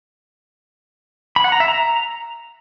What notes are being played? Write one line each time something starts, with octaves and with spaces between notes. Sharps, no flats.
B5
F#5
A#5
E5
A#5